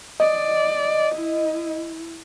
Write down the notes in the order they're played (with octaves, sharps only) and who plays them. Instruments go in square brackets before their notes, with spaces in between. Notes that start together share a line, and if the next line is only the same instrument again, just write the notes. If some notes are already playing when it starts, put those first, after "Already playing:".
[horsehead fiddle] D5 [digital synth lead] D#5
[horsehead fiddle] E4